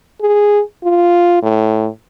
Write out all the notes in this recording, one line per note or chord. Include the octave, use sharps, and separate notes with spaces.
G#4
F4
A2